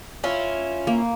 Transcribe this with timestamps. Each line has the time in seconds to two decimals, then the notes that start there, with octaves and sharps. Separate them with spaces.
0.24 C#4 E4 F4
0.87 A#3